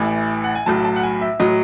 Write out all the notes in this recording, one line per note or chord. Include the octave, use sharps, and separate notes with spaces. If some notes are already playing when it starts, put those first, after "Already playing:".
Already playing: A1 A2 E3
F#5
G#5
B1 A2 F#3 A5
A5
F#5
G#5
E5
A2 F#3 D#5